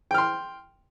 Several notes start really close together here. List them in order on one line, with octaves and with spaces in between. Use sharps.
G5 F6 C6